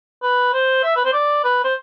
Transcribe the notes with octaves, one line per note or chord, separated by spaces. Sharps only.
B4
C5
E5
B4
C5
D5
B4
C5